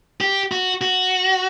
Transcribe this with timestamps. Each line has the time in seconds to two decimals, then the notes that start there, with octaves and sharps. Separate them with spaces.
0.21 G4
0.52 F#4
0.81 F#4